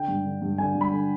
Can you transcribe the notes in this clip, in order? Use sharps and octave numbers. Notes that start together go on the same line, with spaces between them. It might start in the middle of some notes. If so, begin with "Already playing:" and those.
Already playing: D3 G5
G2
D3
G2
D3 G#5
G2
B5
D3